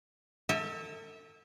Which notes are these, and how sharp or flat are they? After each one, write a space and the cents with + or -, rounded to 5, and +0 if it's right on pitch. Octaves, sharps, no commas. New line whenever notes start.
A4 +35 E5 -25 G#5 -45